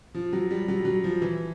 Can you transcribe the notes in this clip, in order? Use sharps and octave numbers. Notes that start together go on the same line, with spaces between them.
F3
F#3
G3
F#3
F#3
F3
E3